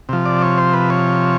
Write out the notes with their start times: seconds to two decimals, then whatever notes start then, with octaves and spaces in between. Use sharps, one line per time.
0.09 C3 F3
0.25 D5
0.42 C#5
0.58 C5
0.73 B4
0.90 C#5